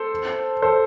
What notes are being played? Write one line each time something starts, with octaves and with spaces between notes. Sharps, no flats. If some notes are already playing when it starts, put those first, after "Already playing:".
Already playing: A4 C5
A4 C5